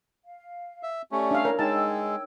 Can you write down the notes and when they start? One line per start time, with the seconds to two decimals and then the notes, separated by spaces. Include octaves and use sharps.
0.23 F5
0.83 E5
1.12 A3 C#4 G4 D5 C#6
1.31 D4 E5 F5
1.45 E4 A#4 C#5
1.59 G#3 D#4 C#5 G5 A5 E6